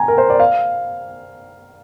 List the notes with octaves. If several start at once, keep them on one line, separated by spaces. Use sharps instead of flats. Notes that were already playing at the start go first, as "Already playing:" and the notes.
Already playing: G#5 A#5
A#4
C5
D5
F5